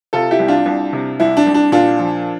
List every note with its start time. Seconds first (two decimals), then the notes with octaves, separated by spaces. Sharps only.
0.13 C3 F4 A4
0.31 E4 G4
0.39 C2
0.48 D4 F4
0.66 C2
0.93 C3
1.20 C2 E4
1.37 D4
1.46 C2
1.54 D4
1.72 A#2 D4 F4
1.99 F3